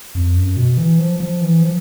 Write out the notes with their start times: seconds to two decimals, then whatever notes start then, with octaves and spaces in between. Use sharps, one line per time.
0.15 F2
0.36 F#2
0.56 B2
0.77 E3
0.99 F3
1.20 F3
1.41 E3
1.62 F3